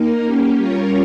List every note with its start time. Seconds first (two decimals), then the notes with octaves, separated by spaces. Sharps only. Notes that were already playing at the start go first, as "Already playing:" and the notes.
Already playing: A#3 D#4 A#4
0.25 A#3 C#4 G4
0.57 G3 C#4 F4 A#4 C#5